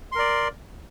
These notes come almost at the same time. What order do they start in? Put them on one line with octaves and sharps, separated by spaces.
C6 A#4 D5